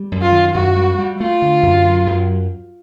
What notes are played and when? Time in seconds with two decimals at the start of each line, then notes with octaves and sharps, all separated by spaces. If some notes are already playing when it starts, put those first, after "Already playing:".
Already playing: G3
0.12 F#2
0.22 F4
0.32 D#3
0.54 F#2 F#4
0.76 G3
0.98 G3
1.20 A3 F4
1.42 D3
1.63 F#2
1.85 F#3
2.06 F#2